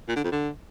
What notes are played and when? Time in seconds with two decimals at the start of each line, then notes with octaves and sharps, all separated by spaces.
0.09 A#2
0.16 D3
0.24 F2
0.32 D3